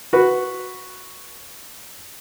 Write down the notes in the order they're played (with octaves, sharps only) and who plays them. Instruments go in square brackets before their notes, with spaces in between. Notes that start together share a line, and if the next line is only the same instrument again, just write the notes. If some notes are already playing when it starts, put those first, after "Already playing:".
[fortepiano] F#4 B4